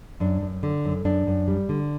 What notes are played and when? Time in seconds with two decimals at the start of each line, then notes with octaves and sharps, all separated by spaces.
0.20 F#2 D4
0.41 F#2
0.63 D3
0.85 F#2
1.05 F#2 D4
1.27 F#2
1.48 G3
1.69 D3